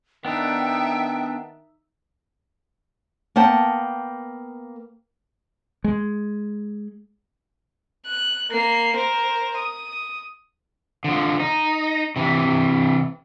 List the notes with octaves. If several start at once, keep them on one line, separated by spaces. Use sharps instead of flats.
D#3 B3 D4 D#4 E5 G5
A#3 B3 F#5 G5 A5
G#3
F#6
A#3 C7
A#4 C5
D#6
D3 F3
D#4
C3 E3